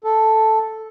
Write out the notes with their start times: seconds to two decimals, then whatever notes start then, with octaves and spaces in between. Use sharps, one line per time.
0.04 A4